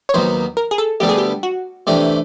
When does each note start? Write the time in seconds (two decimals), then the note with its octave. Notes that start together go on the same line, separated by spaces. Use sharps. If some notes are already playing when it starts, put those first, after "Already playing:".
0.09 C#5
0.14 D#2 D#3 F#3 B3 C5
0.57 A#4
0.71 G#4
0.78 A4
1.00 D2 D3 G3 B3 D4 G4
1.09 G#4
1.18 G4
1.43 F#4
1.87 C3 E3 A3 D4 G4